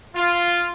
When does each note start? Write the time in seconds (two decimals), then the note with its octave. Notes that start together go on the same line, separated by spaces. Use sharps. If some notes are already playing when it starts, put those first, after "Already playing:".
0.15 F4